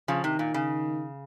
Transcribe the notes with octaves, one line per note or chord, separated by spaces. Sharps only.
C#3 F3
C3 D#3
A#2
C#3